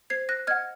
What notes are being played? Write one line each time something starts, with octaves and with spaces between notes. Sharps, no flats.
C5 G#6 C7
F#6 A#6
D#5 F#5 F6 G#6